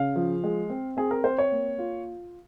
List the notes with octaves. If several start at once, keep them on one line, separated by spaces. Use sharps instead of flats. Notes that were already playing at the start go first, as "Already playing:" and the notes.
Already playing: C#3 F5
F3
G#3
C4
C4 G#4
A#4
C4 C5
C#5
A#3
F4